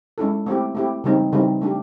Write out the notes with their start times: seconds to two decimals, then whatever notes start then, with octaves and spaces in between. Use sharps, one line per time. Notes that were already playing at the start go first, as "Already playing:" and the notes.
0.18 G#3 C#4 E4 A4
0.46 A3 C4 E4 G4
0.75 A3 C4 E4 G4
1.04 C#3 E3 G3 C4 D#4
1.32 C#3 E3 G3 C4 D#4
1.61 A3 D4 G4